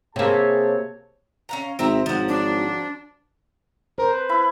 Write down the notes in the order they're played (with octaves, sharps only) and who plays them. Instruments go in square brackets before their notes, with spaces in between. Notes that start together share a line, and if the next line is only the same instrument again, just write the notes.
[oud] C3 A#3 [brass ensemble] G#4 A5 [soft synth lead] C#5
[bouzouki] C#4 F5 A#5
[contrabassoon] G#1 [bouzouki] C4 E5 A#5
[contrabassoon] G#1 [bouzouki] F3 F#3
[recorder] D4
[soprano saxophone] A#4 [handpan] C5
[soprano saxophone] B4
[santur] E4 B5